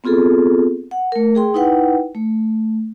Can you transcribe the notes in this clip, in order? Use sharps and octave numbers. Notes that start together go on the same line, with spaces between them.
B3 C4 F4 G#4 A4
F#5
A3 A#4
G#4 G5 C6
D#4 E4 B4 F#5 G5
A3